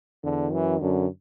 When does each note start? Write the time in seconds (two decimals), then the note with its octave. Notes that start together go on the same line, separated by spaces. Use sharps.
0.23 E2 D3
0.52 F#2 E3
0.81 F#2 D3